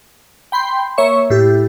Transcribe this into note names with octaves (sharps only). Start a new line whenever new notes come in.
G5 B5 C6 G6
A#3 C#5 E5 C#6
A2 E4 G4